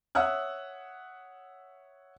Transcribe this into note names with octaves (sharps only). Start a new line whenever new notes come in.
C#5 E5 F#5 D#6 E6 F#6